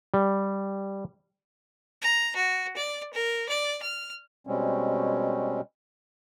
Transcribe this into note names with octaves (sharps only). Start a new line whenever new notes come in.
G3
A#5
F#4
D5
A#4
D5
F6
B2 G3 G#3 C4 C#4